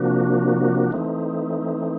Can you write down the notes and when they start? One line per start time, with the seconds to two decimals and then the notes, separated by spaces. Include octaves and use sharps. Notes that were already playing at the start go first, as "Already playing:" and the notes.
Already playing: C3 F3 A#3 D4 F#4
0.91 E3 A3 C4 D#4